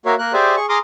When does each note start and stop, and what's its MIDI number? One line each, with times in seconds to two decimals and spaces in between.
0.06 0.14 58
0.06 0.14 66
0.06 0.14 70
0.06 0.14 73
0.06 0.14 76
0.06 0.14 77
0.19 0.33 58
0.19 0.33 70
0.19 0.33 90
0.33 0.55 67
0.33 0.55 68
0.33 0.55 72
0.33 0.55 74
0.33 0.55 76
0.33 0.55 80
0.57 0.66 68
0.57 0.66 85
0.69 0.78 68
0.69 0.78 82
0.69 0.78 84
0.69 0.78 86
0.69 0.78 87
0.69 0.78 89